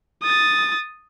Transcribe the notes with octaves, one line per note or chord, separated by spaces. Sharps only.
D#6 A6